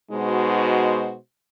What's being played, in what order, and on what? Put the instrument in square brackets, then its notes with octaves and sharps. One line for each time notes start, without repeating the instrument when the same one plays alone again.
[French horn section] B2 G#3 D#4 F#4 C5